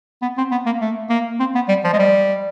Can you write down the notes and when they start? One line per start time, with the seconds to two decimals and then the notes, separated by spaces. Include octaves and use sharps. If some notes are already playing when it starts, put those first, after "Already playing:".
0.22 B3
0.38 C4
0.52 B3
0.66 A#3
0.81 A3
1.10 A#3
1.40 C4
1.55 B3
1.69 G3
1.84 F3
1.93 G#3
1.99 G3